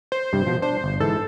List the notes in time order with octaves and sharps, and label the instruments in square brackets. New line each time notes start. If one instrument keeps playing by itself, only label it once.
[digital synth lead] C5
[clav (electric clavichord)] G2 C3 G3
B2 F3
[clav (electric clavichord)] D4 [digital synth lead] C5
[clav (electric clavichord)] G1
[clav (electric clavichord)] G#2 E3 [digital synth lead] A4